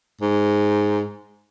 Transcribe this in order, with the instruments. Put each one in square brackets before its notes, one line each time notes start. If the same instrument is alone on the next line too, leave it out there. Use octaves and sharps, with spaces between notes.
[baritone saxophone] G#2